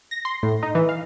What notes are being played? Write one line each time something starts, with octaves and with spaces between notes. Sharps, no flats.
A#6
C6
A2
D#4
E3
F5